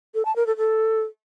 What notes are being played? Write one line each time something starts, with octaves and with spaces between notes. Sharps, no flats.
A4
A5
A#4
A4
A4